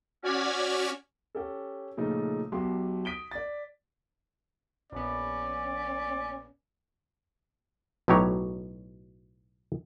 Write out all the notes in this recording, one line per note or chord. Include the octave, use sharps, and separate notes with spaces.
C#4 F#4 D5 F6 G#6 B6
C#4 G4 A4
A#2 C#3 F3 A3 D#4
B1 B2 G4 C6
D#6 B6 D7 G7
D5 A6
A#1 B3 C#4 D5
B1 A2 F#3 G4 C#5 A#5